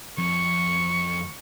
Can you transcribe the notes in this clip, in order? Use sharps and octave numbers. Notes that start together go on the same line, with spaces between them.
F2 C#6